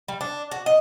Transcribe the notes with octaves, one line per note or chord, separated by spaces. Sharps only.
G3
D4
F#4
D#5